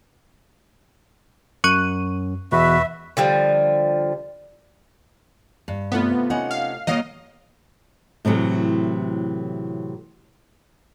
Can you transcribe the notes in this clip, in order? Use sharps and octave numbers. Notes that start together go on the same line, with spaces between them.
F#2 C#6 F#6 D#7
E2 B2 F#4 B4 E5
D3 F3 G3
G2
C3 A3 B3 F4
C#4 D#4 F#5
F5
B2 F#3 A#3 D#5 F5
A2 C3 E3 F#3 A3